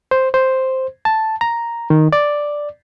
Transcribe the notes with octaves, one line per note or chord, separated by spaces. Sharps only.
C5
C5
A5
A#5
D#3
D5